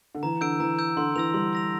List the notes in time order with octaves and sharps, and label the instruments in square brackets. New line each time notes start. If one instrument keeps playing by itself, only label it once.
[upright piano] D3
[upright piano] E3 [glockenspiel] A#5
[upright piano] D3 [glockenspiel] E6 G6 D7
[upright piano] E3 [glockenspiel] A#5
[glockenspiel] E6 G6 D7
[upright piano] D3 [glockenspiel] C6
[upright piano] E3 [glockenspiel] E6 A#6 F7
[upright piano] G3 [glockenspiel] C6
[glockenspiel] E6 A#6 F7